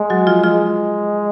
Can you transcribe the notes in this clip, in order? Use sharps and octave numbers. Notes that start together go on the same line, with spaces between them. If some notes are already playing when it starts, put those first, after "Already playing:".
Already playing: G#3
F#3 F#4
F3 F4
F3 G#3 F4